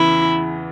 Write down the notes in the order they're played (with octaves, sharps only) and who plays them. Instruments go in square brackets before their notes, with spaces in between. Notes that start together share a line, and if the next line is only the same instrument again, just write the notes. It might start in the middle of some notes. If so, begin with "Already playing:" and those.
Already playing: [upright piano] E2 C#3 E3 [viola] E4